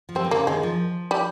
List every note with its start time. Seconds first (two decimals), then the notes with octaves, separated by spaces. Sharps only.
0.09 F3
0.15 G3 C4
0.25 D#3
0.31 C#3 A#3
0.47 D#3 G#3
0.63 F3
1.11 G3